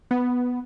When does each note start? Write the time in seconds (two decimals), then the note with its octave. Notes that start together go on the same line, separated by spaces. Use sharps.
0.11 B3